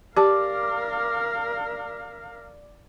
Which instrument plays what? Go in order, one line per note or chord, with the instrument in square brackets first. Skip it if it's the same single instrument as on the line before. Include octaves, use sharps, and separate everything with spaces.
[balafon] G4 A5 [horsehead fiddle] A#4 F5 [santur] D5